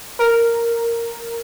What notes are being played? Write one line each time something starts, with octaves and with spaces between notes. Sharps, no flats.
A#4